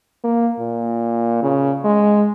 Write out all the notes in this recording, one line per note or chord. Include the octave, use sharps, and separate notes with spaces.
A#3
A#2
C#3
G#3